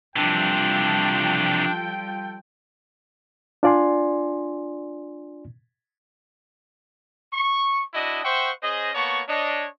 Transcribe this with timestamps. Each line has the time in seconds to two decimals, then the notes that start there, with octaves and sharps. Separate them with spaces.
0.16 C3 E3 F3 G3 D4 F4 A4 G5
3.63 D4 F4 D5 G#5 C6
7.33 C#6
7.94 D4 E4 F#4 D#5
8.24 C5 E5 F#5 G5 C6 C#6
8.63 C#4 G#4 C5 D#5
8.94 A#3 B3 C#5 A5 C#6
9.28 D4 C#5 D#5